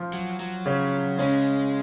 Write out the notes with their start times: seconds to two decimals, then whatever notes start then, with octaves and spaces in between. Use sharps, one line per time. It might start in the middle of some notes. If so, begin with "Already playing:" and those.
Already playing: F3 F4
0.14 F#3
0.40 F#3
0.66 C#3 C#4
1.18 C#3 G#3 C#4